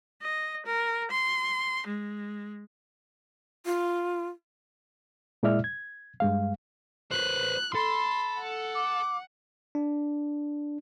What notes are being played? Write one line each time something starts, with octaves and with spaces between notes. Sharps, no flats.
D#5
A#4
C6
G#3
F4
A#2 G#3 E4 D5 E5 F6
G#6
G2 G#3 F5
B4 C5 F#6
A4 B5 C6
F#5
D6
D4